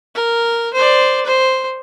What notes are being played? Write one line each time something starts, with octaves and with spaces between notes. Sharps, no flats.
A#4
C5 D5
C5